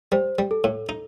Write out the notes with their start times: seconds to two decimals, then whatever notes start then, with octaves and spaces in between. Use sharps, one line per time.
0.12 G3 C5
0.39 G3
0.51 A4
0.64 A2
0.89 D#4